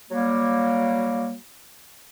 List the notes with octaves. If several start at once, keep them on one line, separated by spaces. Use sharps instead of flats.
F#3 G3 A#3